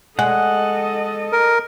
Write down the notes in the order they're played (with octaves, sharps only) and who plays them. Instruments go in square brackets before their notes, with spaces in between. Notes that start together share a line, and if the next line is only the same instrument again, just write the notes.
[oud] G#3 [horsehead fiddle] A4 D#5 [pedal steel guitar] F#5
[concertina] A#4